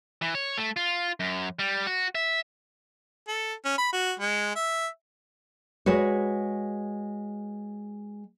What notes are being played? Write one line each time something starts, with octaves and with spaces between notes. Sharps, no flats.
E3
C#5
A3
F4
F#2
G3
F#4
E5
A4
C#4
B5
F#4
G#3
E5
G#3 F#4 B4 C#5